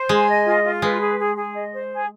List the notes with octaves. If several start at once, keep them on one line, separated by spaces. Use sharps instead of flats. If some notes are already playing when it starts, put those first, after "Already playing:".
Already playing: C5
G#3 G#5
D#5
F4
F4
G#3 B4
G#4
G#4
G#4
D#5
C5
G#4